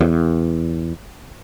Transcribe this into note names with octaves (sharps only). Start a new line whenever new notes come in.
E2